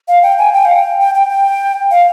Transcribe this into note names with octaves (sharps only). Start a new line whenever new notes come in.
F5
G5
G#5
G5
F5
G5
G5
G5
G5
F5